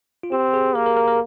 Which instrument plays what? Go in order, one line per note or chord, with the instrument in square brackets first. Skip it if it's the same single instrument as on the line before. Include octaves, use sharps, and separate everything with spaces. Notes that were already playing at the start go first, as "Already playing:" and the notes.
[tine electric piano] F4
[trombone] C4 [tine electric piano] G4
[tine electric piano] G#4
[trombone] A#3 [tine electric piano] A#4
[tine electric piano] A#4
A#4
A#4